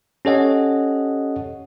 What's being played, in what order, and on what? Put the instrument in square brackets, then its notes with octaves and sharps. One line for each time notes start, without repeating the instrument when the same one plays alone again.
[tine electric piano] C#4 G4 A4 C#5 D#5 F#5